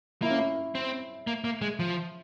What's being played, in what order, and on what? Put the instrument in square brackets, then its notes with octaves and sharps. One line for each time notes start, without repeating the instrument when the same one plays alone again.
[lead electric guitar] A#3 [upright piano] E4
[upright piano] C#4
E4
[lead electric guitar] C4
A#3
A#3
G#3
F3